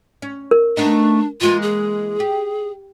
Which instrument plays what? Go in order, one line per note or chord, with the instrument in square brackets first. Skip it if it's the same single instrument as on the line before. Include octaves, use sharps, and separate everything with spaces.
[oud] C#4
[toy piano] A#4
[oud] A3 B3 D#4 [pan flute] D4
[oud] E3 G#3 A#3 [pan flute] F4
[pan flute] G#4
[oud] G4